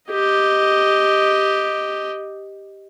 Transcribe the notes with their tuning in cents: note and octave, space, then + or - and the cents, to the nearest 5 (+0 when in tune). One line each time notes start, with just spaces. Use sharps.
G4 +0 D#5 +0